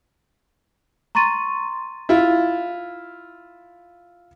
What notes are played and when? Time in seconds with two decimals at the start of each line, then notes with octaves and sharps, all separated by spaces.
1.15 A#5 C6 C#6 A6 D#7
2.09 E4 F4